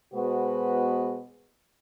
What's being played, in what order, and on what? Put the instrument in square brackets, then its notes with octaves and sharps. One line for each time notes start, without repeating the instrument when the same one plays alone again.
[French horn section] B2 G#3 B3 F#4 B4 C5